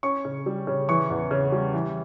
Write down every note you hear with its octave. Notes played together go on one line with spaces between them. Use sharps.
C#4 C#6
C#3
G3
C#3
E3 C#6
E2
C#3
G3
E3